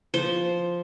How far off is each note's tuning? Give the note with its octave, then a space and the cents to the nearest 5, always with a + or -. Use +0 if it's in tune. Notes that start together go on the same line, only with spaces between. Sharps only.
F3 +0 C5 +0